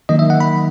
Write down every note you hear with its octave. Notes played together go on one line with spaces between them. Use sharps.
D#3 F#3 A#3 D#4 D#5
E5
F#5
B5